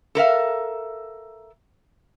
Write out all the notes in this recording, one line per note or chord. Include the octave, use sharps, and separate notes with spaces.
A4 A#4 E5 F5